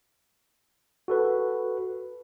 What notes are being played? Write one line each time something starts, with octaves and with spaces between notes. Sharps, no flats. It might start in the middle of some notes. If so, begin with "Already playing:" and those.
F#4 A4 B4